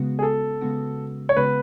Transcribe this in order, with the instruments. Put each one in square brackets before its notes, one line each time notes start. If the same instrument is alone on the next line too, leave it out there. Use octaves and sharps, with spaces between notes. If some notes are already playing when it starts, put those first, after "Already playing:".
Already playing: [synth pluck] C#3 G#3 B3 F#4
[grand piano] G#4
A4
[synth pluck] C#3 G#3 B3 F#4
[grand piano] C#5
[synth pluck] C#3 G#3 B3 F#4 [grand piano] B4